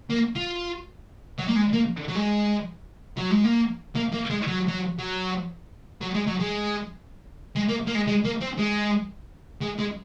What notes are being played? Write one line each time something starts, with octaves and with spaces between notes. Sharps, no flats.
A#3
F4
F#3
A#3
G#3
A#3
F#3
G#3
F#3
G#3
A#3
A#3
A#3
G#3
F#3
F#3
F#3
F#3
G#3
F#3
G#3
G#3
A#3
A#3
G#3
G#3
A#3
C4
G#3
G#3
G#3